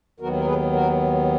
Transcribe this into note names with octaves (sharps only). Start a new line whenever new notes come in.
D#2 D#3 F#3 B3 F#4 A#4
A#4
G#4 B4
F#4 A#4